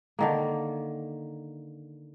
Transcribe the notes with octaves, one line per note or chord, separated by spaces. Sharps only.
D3 D#3 A#3